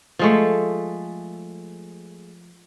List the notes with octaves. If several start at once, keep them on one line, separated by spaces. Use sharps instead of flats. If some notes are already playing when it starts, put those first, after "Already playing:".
F3 G#3 A3